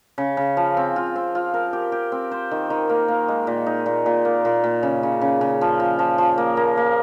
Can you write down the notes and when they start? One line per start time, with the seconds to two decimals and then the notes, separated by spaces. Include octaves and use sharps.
0.18 C#3
0.37 C#3
0.57 F3
0.77 C4
0.96 F4
1.15 C4
1.35 F4
1.54 A#4
1.73 G4
1.92 G4
2.12 C4
2.31 C5
2.51 D#3
2.70 D#3
2.89 A#3
3.08 A#3
3.28 G#3
3.47 A#2
3.66 D#4
3.86 A#2
4.06 A#2
4.25 A#3
4.45 A#2
4.64 A#2
4.83 C#3
5.03 C#3
5.21 C#3
5.41 C#3
5.61 F3
5.80 F3
5.99 F3
6.18 F3
6.38 A#3
6.57 A#3
6.77 A#3